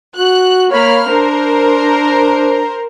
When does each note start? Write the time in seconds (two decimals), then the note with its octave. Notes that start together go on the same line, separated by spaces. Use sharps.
0.17 F#4 F#6
0.71 A#3 C#5 B5 F6
1.09 D4 A#4 C5